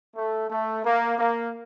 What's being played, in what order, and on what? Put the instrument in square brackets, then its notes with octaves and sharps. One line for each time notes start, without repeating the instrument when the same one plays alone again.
[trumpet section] A3
A3
A#3
A#3